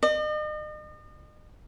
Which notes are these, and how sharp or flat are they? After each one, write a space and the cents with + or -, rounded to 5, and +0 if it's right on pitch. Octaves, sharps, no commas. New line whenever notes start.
D#5 -40